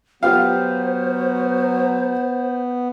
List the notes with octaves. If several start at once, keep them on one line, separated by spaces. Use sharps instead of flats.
F#3 B3 F4 G4 C5 F5